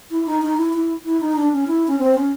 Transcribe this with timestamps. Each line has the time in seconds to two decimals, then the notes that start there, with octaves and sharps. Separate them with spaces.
0.11 E4
0.26 D#4
0.42 D#4
0.57 E4
0.73 E4
1.05 E4
1.20 D#4
1.36 D4
1.52 C#4
1.67 E4
1.88 C#4
1.99 C4
2.15 C#4